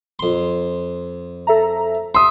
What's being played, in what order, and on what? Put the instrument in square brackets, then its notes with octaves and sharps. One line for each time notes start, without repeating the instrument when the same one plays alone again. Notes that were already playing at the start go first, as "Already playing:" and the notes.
[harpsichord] F2 C6
[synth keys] A4 E5 A#5
[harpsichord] E5 [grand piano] C6 D#6